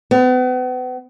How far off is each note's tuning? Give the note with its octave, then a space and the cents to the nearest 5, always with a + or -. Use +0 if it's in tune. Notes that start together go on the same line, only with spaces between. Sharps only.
B3 +40